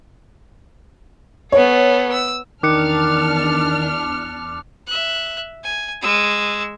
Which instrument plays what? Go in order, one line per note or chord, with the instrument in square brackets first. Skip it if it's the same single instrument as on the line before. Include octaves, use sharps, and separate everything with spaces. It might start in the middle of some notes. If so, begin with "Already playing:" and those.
[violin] B3 A4 [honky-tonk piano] C#5
[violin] E6
[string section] E2 D4 F6 [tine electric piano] D#3 [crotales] D6 F#6 C#7
[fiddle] E5 F#6
G#5
G#3 E6